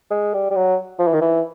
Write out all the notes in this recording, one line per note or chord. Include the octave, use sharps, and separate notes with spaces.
G#3
G3
G3
F#3
F3
E3
D#3
E3